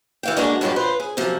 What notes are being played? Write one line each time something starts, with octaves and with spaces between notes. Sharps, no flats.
E3 F5 G5
G#3 A#3 D4 F#4
G2 F3 F#3 G#3 G4
F4 B4 C5
G#4
F#2 C3 F3